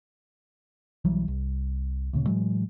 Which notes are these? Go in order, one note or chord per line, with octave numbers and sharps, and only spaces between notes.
B1 E3 F#3 G3
C2
D2 A#2 C#3
A2 E3 F#3 G#3